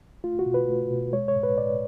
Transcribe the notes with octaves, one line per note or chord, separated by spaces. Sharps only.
A3 F4
F#4
B2
B4
A3
B2
G#3 C#5
C#5
A2
B4
A2 D5